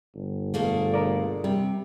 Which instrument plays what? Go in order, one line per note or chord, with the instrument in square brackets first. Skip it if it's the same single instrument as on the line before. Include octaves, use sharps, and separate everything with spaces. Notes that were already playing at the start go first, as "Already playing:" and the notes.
[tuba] G1
[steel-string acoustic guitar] B2 A3 A#3 [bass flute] G#4
[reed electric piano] A#4 D5
[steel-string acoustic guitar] C3 [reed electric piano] G3